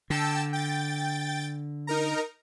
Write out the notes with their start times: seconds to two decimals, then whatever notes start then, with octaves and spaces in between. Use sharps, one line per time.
0.10 D3 G5 A5 E6
0.53 G5 A6
1.87 D#4 A#4 A#5